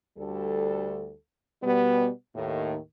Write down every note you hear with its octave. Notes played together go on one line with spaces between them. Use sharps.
D2 G3 A4
B2 G3 B3
D#2 A2 D#3